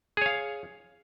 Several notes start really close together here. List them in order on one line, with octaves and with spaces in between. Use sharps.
G#4 C#5 F5